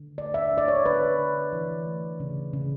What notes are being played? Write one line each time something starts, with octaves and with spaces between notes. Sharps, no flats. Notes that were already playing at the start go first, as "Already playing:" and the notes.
Already playing: D3
A3 D5
E5
D4
D5
C#5
D3 B4
D3
E3
A3
C#3
C#3